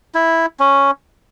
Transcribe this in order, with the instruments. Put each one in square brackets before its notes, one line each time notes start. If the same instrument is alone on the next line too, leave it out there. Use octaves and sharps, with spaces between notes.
[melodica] E4
C#4